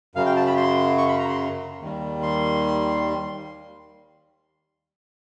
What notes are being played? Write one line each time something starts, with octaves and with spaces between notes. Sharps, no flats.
F#2 C#3 F#3 F5
G5
A5
B5
C6
C#6
B5
A#5
C6
D#2 D#3 G3
C6